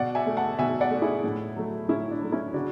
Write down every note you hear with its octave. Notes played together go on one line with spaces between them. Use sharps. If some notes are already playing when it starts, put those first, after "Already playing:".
Already playing: B2 D5 F#5
E5 G#5
A3
F#5 A5
B2 E5 G#5
D5 F#5
A3
E4 G#4
A2
F#3 A3
A2 C#4 E4
D4
F#3 A3
C#4 E4
C#3 D4 F#4